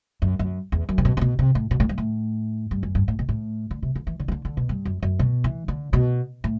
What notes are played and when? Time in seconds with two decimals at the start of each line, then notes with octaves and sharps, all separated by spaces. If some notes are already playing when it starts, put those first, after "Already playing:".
0.22 F#2
0.39 F#2
0.72 E2
0.89 F#2
0.98 C3
1.05 B2
1.17 C3
1.21 B2
1.39 C3
1.55 A2
1.71 B2
1.80 A2
1.89 G2
1.98 A2
2.71 G2
2.83 F#2
2.95 G2
3.08 A2
3.19 B2
3.29 A2
3.71 D3
3.83 C3
3.95 D3
4.07 E3
4.20 D3
4.28 E3
4.32 D3
4.45 D3
4.57 B2
4.69 G2
4.85 F#2
5.03 F#2
5.19 B2
5.44 E3
5.68 D3
5.93 B2
6.44 A2